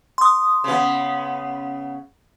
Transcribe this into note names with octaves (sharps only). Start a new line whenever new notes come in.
C6 D#6
C#3 B3